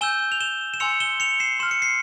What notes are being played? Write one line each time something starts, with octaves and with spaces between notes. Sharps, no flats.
G#5 E6 G6 E7 G7
F7
E7 G7
E7
G#5 C6 E6 C#7 F7
E7 G7
C#7 F7
C7 E7
C6 F6 E7
C#7
C7